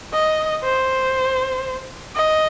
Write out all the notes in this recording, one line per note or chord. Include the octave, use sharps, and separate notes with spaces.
D#5
C5
D#5